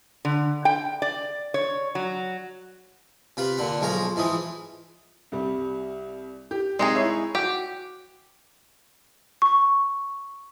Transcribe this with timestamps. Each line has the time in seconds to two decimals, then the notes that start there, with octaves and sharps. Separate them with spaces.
0.25 D3
0.65 G5
1.02 D5
1.54 C#5
1.95 F#3
3.37 C3 F4 B4
3.58 A#2 D3 F#5
3.81 B1 F3 G#3 F4 A#5
4.16 G#2 E3 F3 D#6
5.32 C2 G3
6.51 G4
6.79 C3 G#3 D#4 G#4
6.95 E4 C#5 E5
7.35 F#4 G4
9.42 C#6